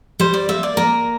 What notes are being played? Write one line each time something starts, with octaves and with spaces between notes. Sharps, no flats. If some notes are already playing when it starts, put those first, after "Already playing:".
G3 C5
D5
A#3 E5
D5
A#3 A#4